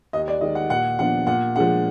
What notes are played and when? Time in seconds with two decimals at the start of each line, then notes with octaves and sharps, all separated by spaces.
0.13 D#2 D#5
0.28 D5
0.41 D#3 G#3 D#5
0.55 F#5
0.70 A#2 F#5
0.99 F3 B3 D4 F#5
1.27 A#2 F#5
1.56 F3 G#3 D4 F#5